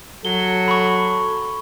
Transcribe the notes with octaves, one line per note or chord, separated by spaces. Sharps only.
F#3 A4 G7
B5 C#6